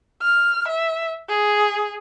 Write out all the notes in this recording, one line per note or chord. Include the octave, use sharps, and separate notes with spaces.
F6
E5
G#4